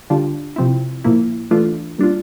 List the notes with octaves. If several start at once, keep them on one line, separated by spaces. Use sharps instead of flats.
D3 G3 D4 F4
C3 F3 C4 E4
A#2 F3 A#3 E4
E3 A3 D4 F4
A#2 G3 D4 F4